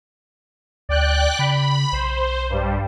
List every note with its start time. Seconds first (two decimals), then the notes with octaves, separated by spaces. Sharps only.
0.89 D2 D5 G5 F#6
1.39 C#3 B5
1.93 B1 C5
2.50 G2 G3